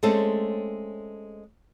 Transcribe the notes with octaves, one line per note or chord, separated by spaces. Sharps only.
G#3 A3 C4 C#4 A4